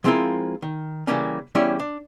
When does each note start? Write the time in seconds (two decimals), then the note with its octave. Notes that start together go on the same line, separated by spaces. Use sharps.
0.04 F3 G#3 C4 E4 F4 A#4
0.62 D#3
1.07 C#3 E3 G3 A#3 C#4
1.55 E2 G3 C#4 E4 C#5 D5
1.79 D4